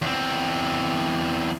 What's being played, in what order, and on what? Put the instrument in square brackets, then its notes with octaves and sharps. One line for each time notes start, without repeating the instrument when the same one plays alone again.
[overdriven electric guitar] E2 C4